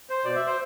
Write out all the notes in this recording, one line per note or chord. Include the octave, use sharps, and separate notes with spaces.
C5
B2 D5
E5
C5